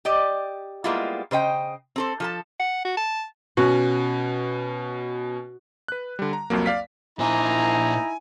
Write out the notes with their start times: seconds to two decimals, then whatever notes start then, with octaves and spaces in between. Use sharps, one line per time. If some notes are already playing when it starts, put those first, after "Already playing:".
0.05 G4 D5 D#5
0.84 G3 G#3 A#3 B3 E4 F4
1.31 C#3 C5 D#5 G5
1.96 C4 A4 C5
2.20 F3 A4 A5
2.60 F#5
2.85 F#4
2.97 A5
3.57 B2 C#4 F#4
5.88 B4 F#6
6.19 D3 G3
6.33 A#5
6.50 C2 F2 F#3 A#3
6.66 D5 F5 B6
7.19 A#2 D#4 E4 C5 G#5 A#5